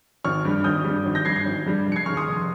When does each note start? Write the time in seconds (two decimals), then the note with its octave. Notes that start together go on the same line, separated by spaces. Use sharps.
0.24 G#1 C#6 F6
0.45 G2 G3
0.64 G#1 D#6 G6
0.85 G3
0.90 G2
1.06 G#1
1.15 G6 A#6
1.25 G2 G3 G#6 C7
1.36 G#6 C7
1.46 G#1
1.66 G2 G3
1.86 F1
1.92 C#7
1.96 G#6 C7
2.06 D#2 C#3 C#6 F6
2.17 C6 D#6
2.27 F1